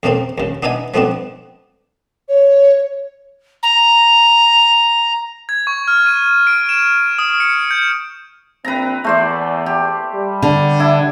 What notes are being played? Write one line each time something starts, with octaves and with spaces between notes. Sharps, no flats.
E2 C#3 A3 A#3 C4
D#2 C#3
B3 D4 D#4 E5 G#5
F3 A3 B3 C4 D4
C#5
A#5
G#6
C#6
F6
D#7
D7
E7
D#6
C#7
G6
A#1 C4 B4 A#5
E2 A3 C5 D5
G4
G3
D3
D4 E4